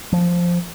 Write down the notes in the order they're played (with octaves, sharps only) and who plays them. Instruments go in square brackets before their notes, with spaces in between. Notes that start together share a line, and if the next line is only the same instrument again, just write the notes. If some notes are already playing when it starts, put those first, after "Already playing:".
[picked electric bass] F3